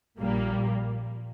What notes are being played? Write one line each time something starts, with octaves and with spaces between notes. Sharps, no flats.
A#1 A#2 G3 A#3